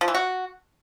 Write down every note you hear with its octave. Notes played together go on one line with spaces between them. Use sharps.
F3
E3
F#4